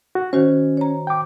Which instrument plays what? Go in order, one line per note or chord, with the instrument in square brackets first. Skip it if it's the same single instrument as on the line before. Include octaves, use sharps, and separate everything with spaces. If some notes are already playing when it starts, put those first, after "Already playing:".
[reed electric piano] F#4
[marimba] D#3 F#4 C5 [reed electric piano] C#4
[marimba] C#5 A#5
[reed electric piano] G5 D6